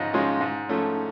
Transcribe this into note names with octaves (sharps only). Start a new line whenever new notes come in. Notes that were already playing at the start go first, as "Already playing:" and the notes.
Already playing: G#2 F3 G#3 C#4 F4 D#5
F3 G#3 C#4 F4
G#2
F3 A3 C#4